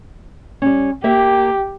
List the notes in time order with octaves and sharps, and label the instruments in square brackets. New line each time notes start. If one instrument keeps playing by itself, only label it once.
[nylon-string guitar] G3 C#4
[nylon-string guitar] A#3 E5 [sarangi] G4